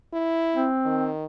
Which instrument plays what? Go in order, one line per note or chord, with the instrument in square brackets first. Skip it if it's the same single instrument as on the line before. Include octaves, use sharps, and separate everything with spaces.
[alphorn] E4
[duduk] C4
[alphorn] D#3